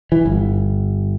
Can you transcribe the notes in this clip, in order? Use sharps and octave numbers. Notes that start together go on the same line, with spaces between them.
E3
G1